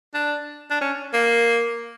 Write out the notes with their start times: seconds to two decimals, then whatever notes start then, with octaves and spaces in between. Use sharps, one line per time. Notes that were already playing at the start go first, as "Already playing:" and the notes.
0.15 D4
0.71 D4
0.81 C#4
1.14 A#3